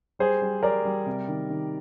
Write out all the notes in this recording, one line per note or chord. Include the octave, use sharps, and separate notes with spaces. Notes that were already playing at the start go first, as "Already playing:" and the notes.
G3 G#4 C5
G3
G3 A#4 D5
G3
C3
D#3
D#3